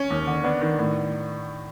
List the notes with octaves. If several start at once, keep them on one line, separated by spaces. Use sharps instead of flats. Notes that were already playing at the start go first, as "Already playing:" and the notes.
Already playing: C#4
D#2
D3
B3 D4
D#3
A2